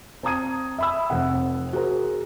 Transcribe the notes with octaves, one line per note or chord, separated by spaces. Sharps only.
C4 A5 A#5 D#6 G#6 D#7
E5 B5 E6
F1 C3 F#5
F#4 G#4 A#4 C5